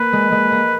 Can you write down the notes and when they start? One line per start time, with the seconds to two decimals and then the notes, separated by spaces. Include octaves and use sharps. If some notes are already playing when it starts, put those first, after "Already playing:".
Already playing: A#3 B4
0.13 G#3
0.32 G#3
0.52 A#3